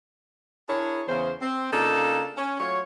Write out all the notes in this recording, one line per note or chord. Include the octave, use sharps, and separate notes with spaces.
D4 E4 G#4 A#4 C#5
E2 C#3 C5
C4
C#3 A#3 D4 D#4 F4 A4
C#4
F#3 A3 F4 C#5